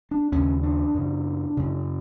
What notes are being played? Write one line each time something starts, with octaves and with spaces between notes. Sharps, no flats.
D4
D#2 C#3 C#4
D4
F#2 C#3
F#2 C#3